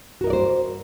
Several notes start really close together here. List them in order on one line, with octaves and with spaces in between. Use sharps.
F#4 A#4 D#5 D5 C5